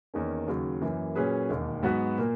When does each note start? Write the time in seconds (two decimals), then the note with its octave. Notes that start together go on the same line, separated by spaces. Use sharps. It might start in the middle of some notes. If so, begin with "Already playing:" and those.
0.14 E2 D#3 A#3 C#4
0.48 D#2 C#3 F#3
0.81 F#2 E3 A#3
1.15 A#2 F#3 C#4 G#4 B4
1.49 E1 D#2 D#3
1.83 G#2 F#3 B3 F#4 B4
2.18 A#2 A#3